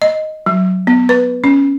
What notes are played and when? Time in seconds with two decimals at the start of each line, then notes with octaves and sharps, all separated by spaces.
0.02 D#5
0.46 F#3
0.87 B3
1.09 B4
1.44 C#4